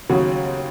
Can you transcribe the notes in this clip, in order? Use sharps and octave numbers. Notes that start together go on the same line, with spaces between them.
D#2 C#3 F#3